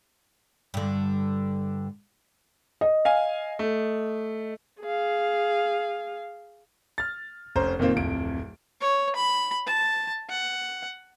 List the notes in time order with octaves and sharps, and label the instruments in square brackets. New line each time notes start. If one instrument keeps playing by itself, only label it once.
[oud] G2 D3
[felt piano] D#5
[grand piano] F5 G#5
A3
[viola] G#4 F5
[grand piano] F6 A6
F1 C#4 C5 A#5
F2 A#2 D#3 A#3 C4 F4
D1 F2 D7
[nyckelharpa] C#5
B5
A5
F#5